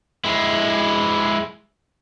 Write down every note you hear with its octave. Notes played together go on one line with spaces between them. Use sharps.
G#3 E4